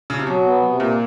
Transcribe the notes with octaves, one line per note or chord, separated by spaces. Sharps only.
C#3
C3
B2 F#3
B3
C3
A#2 A#3